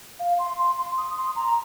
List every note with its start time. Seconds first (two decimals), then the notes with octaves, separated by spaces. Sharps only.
0.19 F5
0.39 C6
0.58 C6
0.77 C6
0.98 D#6
1.17 C6
1.36 A#5